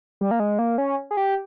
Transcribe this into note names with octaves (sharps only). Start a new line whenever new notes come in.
G3
A#3
G#3
A#3
C#4
G#4
G4